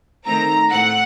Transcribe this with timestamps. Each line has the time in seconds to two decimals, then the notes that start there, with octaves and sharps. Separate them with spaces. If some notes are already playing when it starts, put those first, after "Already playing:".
0.25 D#3 A3 C4 A#5
0.70 A2 A3 C4 F#5